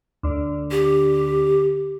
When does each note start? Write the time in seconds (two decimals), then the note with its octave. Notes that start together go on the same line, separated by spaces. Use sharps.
0.23 D2 D3
0.71 G4